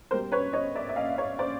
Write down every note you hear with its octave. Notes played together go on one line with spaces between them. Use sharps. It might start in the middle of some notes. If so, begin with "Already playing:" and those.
B2 G3 A#4 C5
B4 C#5
C#5 D#5
D5 E5
E5
D#5 F5
C#5 D#5
C5 D5